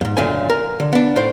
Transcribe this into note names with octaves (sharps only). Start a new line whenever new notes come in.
F2 G#2
C#2 F#2 A#2 D3 A3 G#5
A#4
D3
B3 D4
A2 C5